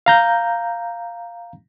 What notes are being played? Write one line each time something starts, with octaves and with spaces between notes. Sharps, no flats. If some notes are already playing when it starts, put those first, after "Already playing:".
F5 A#5 G6